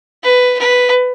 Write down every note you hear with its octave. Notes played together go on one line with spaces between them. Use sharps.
B4
B4